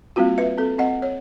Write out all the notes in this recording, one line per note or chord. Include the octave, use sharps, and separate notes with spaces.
G3 A#3 C4 F4 F#4
B4 E5
C4 A4
C4 D#5 F#5
C#5